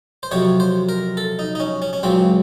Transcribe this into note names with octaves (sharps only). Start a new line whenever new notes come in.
C5
F2 C3 F#3 C#5
C5
A#4
A4
D#4
D#4
C#4
C#4
C#4
C#2 C#3 F#3 C4